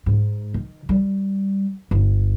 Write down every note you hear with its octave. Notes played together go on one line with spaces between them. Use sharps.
G#2
D#3
G3
G1